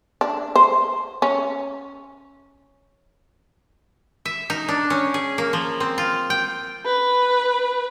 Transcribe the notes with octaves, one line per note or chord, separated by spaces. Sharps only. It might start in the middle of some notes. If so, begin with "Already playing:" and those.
D4
C5
C#4
E5
D#4
D4
C#4
G#4
A#3
F3
C4
F4
G5
B4